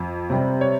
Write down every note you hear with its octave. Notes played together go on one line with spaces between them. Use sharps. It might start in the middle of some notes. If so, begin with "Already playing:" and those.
Already playing: F2
C3 G3 C4
C#5